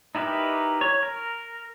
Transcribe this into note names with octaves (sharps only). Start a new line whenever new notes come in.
D#4 E4 G4 A#4 B4
C#5
A#4